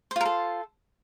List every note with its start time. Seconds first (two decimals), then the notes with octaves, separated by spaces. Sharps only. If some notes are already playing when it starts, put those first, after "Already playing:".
0.11 C5
0.16 F4
0.21 A#4
0.25 A4